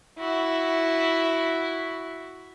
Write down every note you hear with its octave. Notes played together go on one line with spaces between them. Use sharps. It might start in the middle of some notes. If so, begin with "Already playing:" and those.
E4 F#4